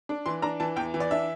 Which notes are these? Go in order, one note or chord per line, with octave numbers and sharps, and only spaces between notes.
D4
E3 C6
D4 A#5
E3 A5
E2 G5
E3
D5
D4 E5